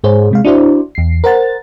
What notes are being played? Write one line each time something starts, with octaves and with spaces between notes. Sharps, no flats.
G#2 G#4 C5 C#5
C3 G#3 F5
D4 E4 F#4 C5 D5
E2 C7
A#4 C5 F#5 A6